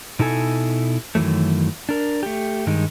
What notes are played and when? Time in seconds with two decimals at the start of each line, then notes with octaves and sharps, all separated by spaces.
0.19 B2 D#4 E4 A4 G#5
1.15 F#2 D#3 E3 F#3 A3
1.89 D4 A#4
2.23 A3 G4
2.66 G2 D#3 G#3 D#4